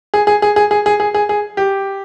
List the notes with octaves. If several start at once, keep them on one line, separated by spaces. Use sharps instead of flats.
G#4
G#4
G#4
G#4
G#4
G#4
G#4
G#4
G#4
G4